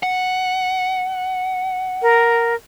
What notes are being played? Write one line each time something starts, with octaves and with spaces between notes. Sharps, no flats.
F#5
A#4